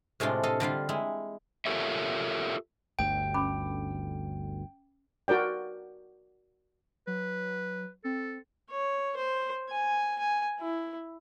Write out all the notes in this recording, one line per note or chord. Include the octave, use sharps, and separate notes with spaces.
A2 C3 G#3 D4 F4
A4 D#5 F5
D3 G3 F4 F5
G#3 E4
F4 G4 A4 A#4 C#5 E5
G1 D2 G2 G5
C#4 B5 D6
F#4 A#4 D5 G5
F#3 B4
C4 A4
C#5
C5
G#5
G#5
E4